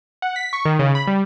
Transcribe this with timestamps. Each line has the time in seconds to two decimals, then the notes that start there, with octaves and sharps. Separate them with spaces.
0.22 F#5
0.36 B6
0.53 C#6
0.65 D#3
0.79 C#3
0.95 B5
1.07 G3